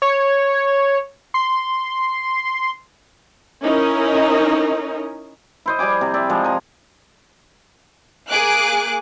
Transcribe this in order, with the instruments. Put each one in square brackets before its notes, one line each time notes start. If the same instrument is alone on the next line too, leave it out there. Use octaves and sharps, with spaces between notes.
[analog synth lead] C#5
C6
[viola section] C#4 D#4 E4 A#4 D#5
[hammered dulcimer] E4 C5 D#5
G3 G#4 G#5 D6
C3
D5 E5
F3 G#3
G#5 A#5
[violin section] A#3 G#4 D6 F#6